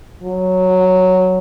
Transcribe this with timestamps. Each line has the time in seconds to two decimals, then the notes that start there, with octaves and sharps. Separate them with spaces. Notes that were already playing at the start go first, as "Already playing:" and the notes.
0.23 F#3